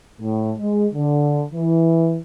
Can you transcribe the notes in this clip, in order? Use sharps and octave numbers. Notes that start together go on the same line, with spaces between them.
A2
G#3
D3
E3